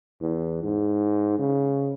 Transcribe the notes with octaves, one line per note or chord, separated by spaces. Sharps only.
E2
G#2
C#3